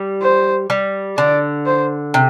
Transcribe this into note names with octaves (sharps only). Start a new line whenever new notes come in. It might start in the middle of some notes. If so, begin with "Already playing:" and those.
Already playing: G3
C5
G3
D3 D5
C5
C3